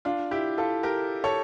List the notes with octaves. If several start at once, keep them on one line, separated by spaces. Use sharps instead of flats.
D4 F4
E4 G4
F4 A4
G4 A#4
A4 C#5